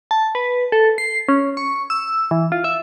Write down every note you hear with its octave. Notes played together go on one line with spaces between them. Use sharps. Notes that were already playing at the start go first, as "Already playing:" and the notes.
A5
B4
A4
C7
C#4
C#6
E6
E3
F4
E5